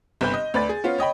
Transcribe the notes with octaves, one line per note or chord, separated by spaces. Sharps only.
G1 C3 B4 B5 G6
D#5
D2 B4 D5 A6
G#4
B3 C#4 F4
C#5 D#5 G5 B5